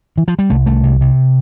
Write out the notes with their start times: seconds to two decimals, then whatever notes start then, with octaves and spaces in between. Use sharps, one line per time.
0.18 E3
0.28 F3
0.39 G3
0.50 C2 A3
0.66 C2 A3
0.84 C3
1.01 C3